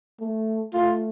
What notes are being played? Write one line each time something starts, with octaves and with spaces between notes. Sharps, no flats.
A3
A3 F4